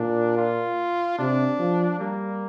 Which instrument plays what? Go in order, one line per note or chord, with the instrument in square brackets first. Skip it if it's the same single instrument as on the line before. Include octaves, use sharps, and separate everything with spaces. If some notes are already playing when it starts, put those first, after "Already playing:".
Already playing: [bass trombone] A#2 [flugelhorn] D4
[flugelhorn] F4
[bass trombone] C3 [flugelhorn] D4
[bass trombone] F3
[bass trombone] G3 [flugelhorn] A#3